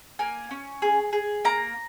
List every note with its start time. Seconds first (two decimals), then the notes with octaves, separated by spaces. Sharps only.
0.19 A#3 G#5
0.51 C#4
0.82 G#4
1.13 G#4
1.45 A#3 A#5